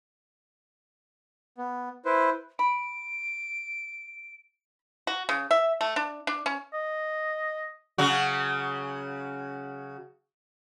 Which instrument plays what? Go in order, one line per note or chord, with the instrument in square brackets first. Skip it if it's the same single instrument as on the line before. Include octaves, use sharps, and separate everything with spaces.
[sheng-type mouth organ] B3
E4 B4 C5
[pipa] B5 [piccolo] D7
[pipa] F#4
C#3
E5
A3
D4
D4
C#4
[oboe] D#5
[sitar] C#3 F#3 F#4